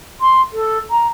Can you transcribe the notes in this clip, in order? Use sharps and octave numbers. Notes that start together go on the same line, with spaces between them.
C6
A4
A#5